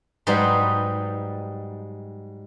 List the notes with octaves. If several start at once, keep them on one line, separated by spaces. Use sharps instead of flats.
G#2 F#3 G3 D#4 B4 C6